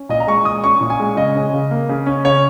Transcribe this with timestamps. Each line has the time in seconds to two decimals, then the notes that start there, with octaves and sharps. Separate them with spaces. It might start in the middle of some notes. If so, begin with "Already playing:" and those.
Already playing: C#4
0.09 A#2 D#5
0.20 A#5
0.27 G#3 C#6
0.45 A#2 D#6
0.64 C#4 C#6
0.81 A#2
0.90 G#5
1.00 G#3
1.17 C#3 D#5
1.35 C#4
1.53 C#3
1.71 A#3
1.89 C#3
2.06 C#4
2.25 C#3 C#5